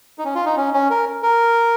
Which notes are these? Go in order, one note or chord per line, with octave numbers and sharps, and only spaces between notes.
D#4
C#4
F4
D#4
C#4
C#4
A#4
A#4